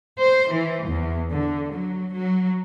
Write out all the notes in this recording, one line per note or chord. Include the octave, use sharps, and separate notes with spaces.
C5
E3
E2
D3
F#3
F#3